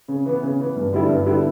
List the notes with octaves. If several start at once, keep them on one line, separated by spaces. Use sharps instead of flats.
C#3
E3 B3
C#3
E3 B3
G2
D3 G3 B3 E4
G2
D3 G3 B3 E4